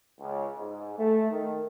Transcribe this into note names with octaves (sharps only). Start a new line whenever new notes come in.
C#2
G#2
A3
D#3